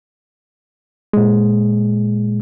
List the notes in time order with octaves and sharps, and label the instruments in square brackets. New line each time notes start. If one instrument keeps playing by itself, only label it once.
[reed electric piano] A#2 G#3